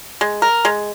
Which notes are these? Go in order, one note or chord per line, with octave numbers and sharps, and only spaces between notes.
G#3
A#4
G#3